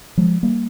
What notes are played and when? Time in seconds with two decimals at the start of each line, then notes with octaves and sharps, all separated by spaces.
0.17 F3 G#3
0.43 G3 A#3